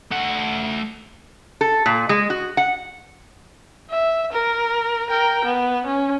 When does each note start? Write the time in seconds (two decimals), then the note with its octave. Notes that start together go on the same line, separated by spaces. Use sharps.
0.12 A3 F#5
1.61 A4
1.86 A#2
2.09 G#3
2.30 F#4
2.57 F#5
3.90 E5
4.32 A#4
5.10 A#4 G5
5.45 B3
5.86 C#4